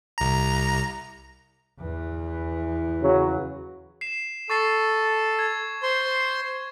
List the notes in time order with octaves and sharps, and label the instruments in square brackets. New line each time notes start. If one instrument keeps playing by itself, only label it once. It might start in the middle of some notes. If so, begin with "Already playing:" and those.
[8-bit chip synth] C2 A#5
[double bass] E2 E3
[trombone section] C#3 F#3
[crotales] C7 E7
[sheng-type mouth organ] A4 [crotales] C#6 A6 C7
[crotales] G#6
[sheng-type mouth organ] C5 C6